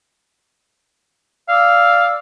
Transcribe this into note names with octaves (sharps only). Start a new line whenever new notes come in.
D5 F5 D6 E6